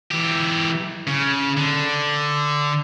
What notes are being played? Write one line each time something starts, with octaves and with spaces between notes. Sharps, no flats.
E3 G4
C#3
D3